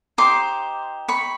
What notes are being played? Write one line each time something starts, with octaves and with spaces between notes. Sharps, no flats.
D#4 G4 C5 C6 D6
B5 C#6